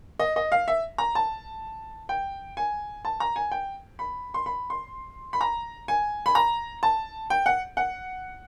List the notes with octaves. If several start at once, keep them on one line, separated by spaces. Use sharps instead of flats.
D#5
D#5
F5
E5
A#5
A5
G5
G#5
A5
A#5
G#5
G5
B5
C6
B5
C6
B5
A#5
G#5
B5
A#5
A5
G5
F#5
F#5